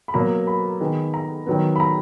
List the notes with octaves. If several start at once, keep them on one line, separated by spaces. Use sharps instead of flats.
B5
B2 F#3 A#3 A#5
B5
D#3 G#3 B3
A#5
D#3 F#3 B3
B5
A#5